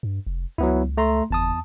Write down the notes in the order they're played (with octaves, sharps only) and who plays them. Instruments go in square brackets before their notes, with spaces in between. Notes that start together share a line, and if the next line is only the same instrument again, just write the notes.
[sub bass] G2
F1
[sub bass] C#2 [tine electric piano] F#3 B3 E4
[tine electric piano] A3 A#5 C6
[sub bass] F#1 [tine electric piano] E2 A5 D#6